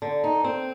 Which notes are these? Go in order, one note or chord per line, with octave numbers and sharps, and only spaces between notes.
D3
D#4
C4